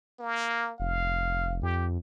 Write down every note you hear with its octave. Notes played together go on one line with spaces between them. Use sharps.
A#3
F1 F5
F2 G4